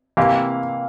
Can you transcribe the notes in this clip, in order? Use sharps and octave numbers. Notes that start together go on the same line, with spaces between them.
C3 E3 A#3 E4 G4 F5